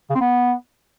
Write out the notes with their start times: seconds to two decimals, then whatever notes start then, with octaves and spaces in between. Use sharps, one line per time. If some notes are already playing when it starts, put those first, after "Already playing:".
0.10 C#3
0.15 C4
0.21 B3